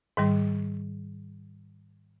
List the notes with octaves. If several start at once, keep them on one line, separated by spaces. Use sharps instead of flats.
G#2 D#3 G3